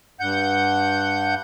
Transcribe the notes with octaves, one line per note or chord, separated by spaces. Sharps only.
G2 F#5 G6